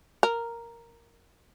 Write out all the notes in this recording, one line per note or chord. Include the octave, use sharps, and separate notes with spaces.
A#4